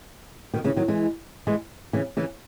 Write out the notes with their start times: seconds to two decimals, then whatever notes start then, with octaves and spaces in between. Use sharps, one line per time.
0.54 B2 D#3
0.64 C#3 E3
0.76 D#3 F#3
0.88 E3 G#3
1.47 E3 G#3
1.93 C#3 E3
2.17 C#3 E3